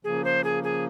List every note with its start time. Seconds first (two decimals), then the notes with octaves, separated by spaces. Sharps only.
0.04 C#3 F3 A#3 G#4
0.24 C5
0.44 G#4
0.64 G#4